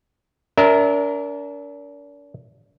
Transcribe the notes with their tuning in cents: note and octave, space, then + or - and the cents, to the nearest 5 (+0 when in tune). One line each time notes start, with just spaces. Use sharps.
D4 -40 A#4 +0 E5 -25